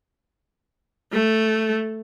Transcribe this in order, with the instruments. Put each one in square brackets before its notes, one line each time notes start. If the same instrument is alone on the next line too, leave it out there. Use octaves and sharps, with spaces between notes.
[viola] A3